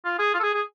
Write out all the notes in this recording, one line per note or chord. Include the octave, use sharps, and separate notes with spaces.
F4
G#4
F4
A4
G#4
G#4